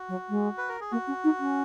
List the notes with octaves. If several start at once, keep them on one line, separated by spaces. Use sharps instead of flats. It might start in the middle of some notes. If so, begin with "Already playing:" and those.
Already playing: F#4
F#3
G#3
B4
A#4
G#4
A#3 F#4
C#4
D#4
C#4